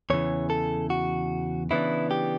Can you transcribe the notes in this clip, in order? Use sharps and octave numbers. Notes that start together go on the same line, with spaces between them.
E2 C#3 E3 C#5
A4
F#4
C#3 E3 B3 D4 E4
G4